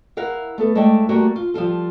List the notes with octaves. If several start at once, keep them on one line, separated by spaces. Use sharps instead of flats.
E4 A#4 F5 F#5
A3 B3 A4
G#3 A3 E4 C5 D5 G5
G3 A3 A#3 F#4
F4
F3 G3 F4 A4